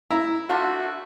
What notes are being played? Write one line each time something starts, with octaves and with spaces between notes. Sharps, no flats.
E4 A#5
A3 D4 F4 F#4